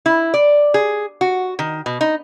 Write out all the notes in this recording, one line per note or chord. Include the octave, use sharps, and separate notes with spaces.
E4
D5
G#4
F#4
D#3
B2
D#4